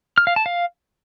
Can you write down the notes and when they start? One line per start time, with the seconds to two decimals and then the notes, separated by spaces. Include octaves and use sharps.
0.18 F6
0.27 F5
0.36 A5
0.46 F5